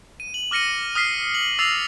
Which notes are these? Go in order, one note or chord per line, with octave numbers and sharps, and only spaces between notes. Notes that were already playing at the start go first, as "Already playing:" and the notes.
D#7
F#7
D6 F6 A#6 C#7 D#7
D#6 F6 B6 C7
F#7
D6 E6 A6 A#6 C7 F7